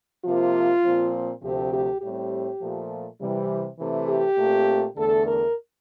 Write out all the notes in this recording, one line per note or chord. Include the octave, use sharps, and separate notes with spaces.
C3 F3 A#3 F4
A#2 F3 C4
D2 C3 F3 A3 C4 G4
G4
A2 G3 C4 G4
A#2 F3 A3
C3 E3 G3
C3 E3 A3
G4
A#2 A3 C4
E2 D3 A3 A4
A#4